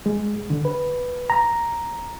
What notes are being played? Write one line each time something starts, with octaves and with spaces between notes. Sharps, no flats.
G#3
D3
B4
A#5